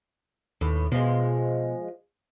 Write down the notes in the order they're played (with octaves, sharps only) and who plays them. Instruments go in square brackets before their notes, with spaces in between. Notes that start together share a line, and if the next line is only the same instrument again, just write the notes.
[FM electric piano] D#2 [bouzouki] A2 B3
[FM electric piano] B2 [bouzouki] F3 G#3